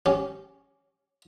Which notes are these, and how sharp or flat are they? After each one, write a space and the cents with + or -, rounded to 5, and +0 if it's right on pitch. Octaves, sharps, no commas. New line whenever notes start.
C#4 +0 G4 -15